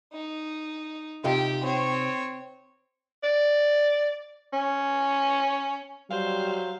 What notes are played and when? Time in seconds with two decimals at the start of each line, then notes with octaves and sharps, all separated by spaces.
0.13 D#4
1.24 C3 D#4 F4 G4 G5
1.63 C4 C#5
3.23 D5
4.53 C#4
6.10 F#3 G3 C5 F5